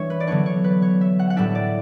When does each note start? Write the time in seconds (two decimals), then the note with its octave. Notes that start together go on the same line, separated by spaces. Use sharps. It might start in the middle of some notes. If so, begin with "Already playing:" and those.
Already playing: E3 G3 D4 C#5 E5
0.10 B4
0.20 D5
0.27 D3 F#3 B3 D4 C#5
0.46 C#5
0.64 B4
0.82 C#5
1.01 E5
1.19 F#5
1.30 F#5
1.36 A2 G3 D4 E5
1.55 D5